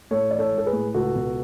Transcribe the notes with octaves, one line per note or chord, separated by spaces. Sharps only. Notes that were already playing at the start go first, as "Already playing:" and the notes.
A2 A4 C#5
E3 D5
A4 C#5
G#3
A4
G#4 B4
A2
C#2 F#4 A4
B2